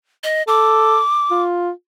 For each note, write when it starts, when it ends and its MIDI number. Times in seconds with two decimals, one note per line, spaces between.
0.24 0.43 75
0.48 1.00 69
0.48 1.43 86
1.31 1.71 65